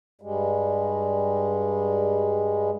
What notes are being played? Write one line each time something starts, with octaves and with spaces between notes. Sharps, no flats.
G2 G3 G#3